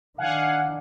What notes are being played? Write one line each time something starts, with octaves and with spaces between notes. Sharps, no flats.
D#3 D4 F5 F#5 G#5